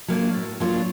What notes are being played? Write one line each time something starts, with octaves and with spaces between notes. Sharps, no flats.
F#3 A#3 D4 F4
A2
F#3 A#3 D4 F4